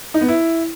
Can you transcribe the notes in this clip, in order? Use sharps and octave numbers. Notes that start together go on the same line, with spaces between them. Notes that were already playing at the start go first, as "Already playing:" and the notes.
D#4
B3
E4